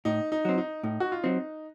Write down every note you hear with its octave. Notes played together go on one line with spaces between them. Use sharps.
A2 D#4
D#4
F#3 C4
D#4
A2 D#4
F#4
F4
F#3 C4 D#4